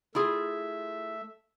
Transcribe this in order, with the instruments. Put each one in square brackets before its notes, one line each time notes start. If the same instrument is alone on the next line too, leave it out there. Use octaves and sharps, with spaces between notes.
[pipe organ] A3 E5 [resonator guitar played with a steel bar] E4 F4 G#4